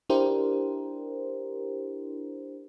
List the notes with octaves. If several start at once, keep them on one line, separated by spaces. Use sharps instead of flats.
D4 E4 G4 A#4 C5